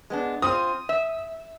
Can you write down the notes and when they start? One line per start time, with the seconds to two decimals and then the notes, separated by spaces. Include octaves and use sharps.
0.10 G#3 B3 D4
0.42 C4 F4 D#6
0.89 E5